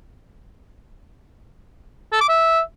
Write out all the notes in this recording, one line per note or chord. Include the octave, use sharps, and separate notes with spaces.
A4
D6
E5